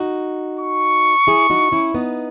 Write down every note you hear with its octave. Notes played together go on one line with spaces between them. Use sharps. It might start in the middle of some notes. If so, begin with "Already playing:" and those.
Already playing: D#4 F#4
C#6
E4 G#4
D#4 F#4
C#4 E4
B3 D#4